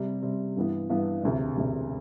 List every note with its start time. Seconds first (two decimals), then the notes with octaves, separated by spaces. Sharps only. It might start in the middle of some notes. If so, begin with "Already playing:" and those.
Already playing: C3 G3 C4
0.23 C3 G3 C4
0.56 G2 E3 B3
0.90 G2 E3 B3
1.23 E1 D2 C3
1.57 E1 D2 C3